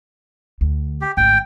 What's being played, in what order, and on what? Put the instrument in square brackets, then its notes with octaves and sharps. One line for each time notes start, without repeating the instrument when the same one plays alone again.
[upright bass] D2
[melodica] G4
[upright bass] G#1 D2 [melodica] G5